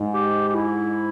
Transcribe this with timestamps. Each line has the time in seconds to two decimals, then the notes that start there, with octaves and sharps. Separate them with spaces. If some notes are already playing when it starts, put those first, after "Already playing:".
Already playing: G#2
0.14 G4
0.48 G4
0.54 E4